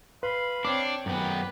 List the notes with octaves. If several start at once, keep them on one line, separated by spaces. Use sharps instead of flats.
B4 F5 B5 C6
C4 D4 C#5 D6
F#2 B3 G4 B4 A#5